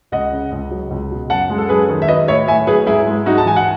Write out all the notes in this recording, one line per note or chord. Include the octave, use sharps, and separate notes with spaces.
C#2 D#5 F#5
C#3
C#2
F#3
C#2
B2
F#2 F#5 A5
G#3
A4
F#2 G#4 B4
D#3
E5
F#3 B4 D#5
A2 C#5 E5
A2 E5 G#5
F#3 G#4 B4
G#2 E4 G#4
G#3
G#2 D#4 F#4
A5
E3 G#5
F#5